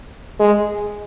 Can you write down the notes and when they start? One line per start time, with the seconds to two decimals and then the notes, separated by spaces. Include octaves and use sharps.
0.39 G#3